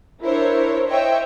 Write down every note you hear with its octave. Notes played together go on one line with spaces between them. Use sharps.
D4 E4 A#4 C5 C#5
C5 C#5 D#5 E5 G5